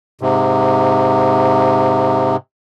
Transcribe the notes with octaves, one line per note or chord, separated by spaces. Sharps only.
G#2 C3